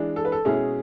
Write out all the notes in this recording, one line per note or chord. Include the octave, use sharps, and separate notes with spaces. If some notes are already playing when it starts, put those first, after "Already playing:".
Already playing: E3 G#3 D4
A4
B4
A4
B2 G#3 C#4 E4 G#4